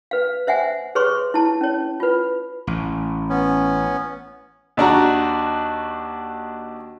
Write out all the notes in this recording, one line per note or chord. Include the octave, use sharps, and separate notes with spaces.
B4 F5
C5 E5 F#5 G#5
G#4 B4 C#5 C6 C#6
E4 A5
C#4 C#5
F4 B4
A1
B3 C#4
D#2 D4 F#4 A#5